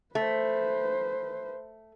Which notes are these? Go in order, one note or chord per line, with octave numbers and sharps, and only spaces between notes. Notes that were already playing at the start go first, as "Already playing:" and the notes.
A3 B4 C5